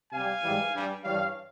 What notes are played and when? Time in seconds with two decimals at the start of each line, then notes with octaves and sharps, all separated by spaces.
0.11 C3 G3 F5 G#5
0.42 G#2 E3 G3
0.73 G2 G3
1.04 G2 E3 G3 C#5 F5